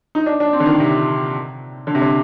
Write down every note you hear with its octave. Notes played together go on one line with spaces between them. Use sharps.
D#4
D4
D4
C4
D3
D#3
C3
D3
C3
D3